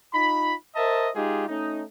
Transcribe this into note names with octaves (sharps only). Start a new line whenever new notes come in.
D#4 F4 B5
A#4 C5 D#5 E5 A5
G#3 D#4 F4 G4 G#4
A3 C#4 D#4